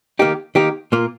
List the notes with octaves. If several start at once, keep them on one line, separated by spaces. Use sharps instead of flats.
D#3 A#3 D#4 G4
D#3 A#3 D#4 G4
A#2 A#3 F4